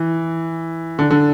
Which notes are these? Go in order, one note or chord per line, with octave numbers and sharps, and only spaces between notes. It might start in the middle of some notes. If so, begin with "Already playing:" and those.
Already playing: E3
D3
D3